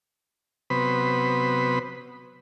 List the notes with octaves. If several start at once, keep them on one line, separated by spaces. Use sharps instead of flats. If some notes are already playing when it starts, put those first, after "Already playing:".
C3 F#3 B3 B4 C5 B5